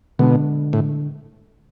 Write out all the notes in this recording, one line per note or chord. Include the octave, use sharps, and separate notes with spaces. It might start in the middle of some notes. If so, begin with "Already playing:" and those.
B2 D3 G#3 D4
A2